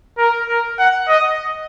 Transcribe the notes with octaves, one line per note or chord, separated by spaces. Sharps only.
A#4
A#4
F#5
D#5